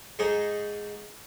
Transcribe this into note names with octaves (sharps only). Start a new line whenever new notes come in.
G#2 G#3 D#4 G#5